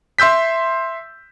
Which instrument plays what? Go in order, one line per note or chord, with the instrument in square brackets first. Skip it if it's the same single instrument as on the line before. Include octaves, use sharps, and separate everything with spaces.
[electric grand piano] E5 C6 E6 G6 B6